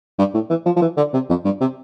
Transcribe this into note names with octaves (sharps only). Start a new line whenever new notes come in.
G2
A2
E3
F3
F3
E3
D3
C3
F2
G2
C3